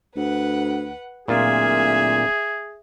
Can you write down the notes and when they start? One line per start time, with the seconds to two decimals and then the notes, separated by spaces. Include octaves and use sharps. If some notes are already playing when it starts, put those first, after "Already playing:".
0.16 D2 B4 F#5
1.28 D1 A#2 F4 G#4 E5